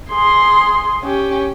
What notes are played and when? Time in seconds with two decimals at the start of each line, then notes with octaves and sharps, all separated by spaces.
0.10 G#4 C6
1.02 C#4 G4